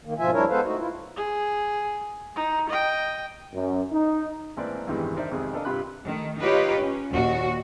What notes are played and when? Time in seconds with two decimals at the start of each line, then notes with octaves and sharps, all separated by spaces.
0.05 D#3 A#3
0.19 G#2 B2 F3 F4 E5 G#5
0.33 D2 G3 D4 E4 A#4 C#5
0.50 G#3 B3 A4 B4 C5 F5
0.64 A3 D#4 F#4
0.77 E4 F4
1.16 G#4
2.36 D#4
2.70 D#5 G5
3.54 F#2
3.93 D#4
4.57 A1 G#2 A#3 C4 B4 D5
4.87 E2 G2 C3 D#3 E3 G#3
5.16 D4 D#4 A#4 C5 D5 E5
5.31 G#1 F2 G#2 C3 G#4
5.53 D4 A4 A#4 D#5 F5
5.65 G2 C3 F4 G4 B5 F#6
6.03 D#3 A3
6.40 D#4 F4 G4 B4 C#5
6.82 C#4
7.13 D#2 A#2 F#4